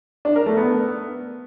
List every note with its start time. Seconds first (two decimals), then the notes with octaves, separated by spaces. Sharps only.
0.25 D4
0.36 A#4
0.46 A3
0.57 B3